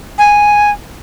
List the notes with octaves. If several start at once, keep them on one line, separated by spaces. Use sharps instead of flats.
G#5